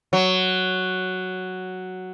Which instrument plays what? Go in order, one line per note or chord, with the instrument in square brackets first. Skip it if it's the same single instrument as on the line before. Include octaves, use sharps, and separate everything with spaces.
[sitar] F#3